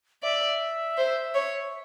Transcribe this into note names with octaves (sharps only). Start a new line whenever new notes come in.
D5 E5
C5
C#5